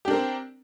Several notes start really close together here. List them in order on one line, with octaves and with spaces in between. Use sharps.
G4 D4 A#4 C4